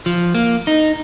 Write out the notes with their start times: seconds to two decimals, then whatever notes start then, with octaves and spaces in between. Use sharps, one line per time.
0.06 F3
0.35 A#3
0.67 D#4